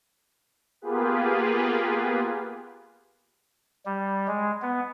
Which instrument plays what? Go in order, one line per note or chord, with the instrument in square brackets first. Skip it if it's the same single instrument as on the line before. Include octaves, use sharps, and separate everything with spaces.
[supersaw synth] A#3 B3 F4 G4 G#4 B4
[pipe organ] G3
G#3
B3